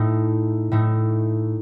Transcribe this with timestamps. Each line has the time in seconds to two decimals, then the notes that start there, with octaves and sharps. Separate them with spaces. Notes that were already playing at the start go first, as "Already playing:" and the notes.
Already playing: A2 A3 D#4
0.72 A2 A3 D#4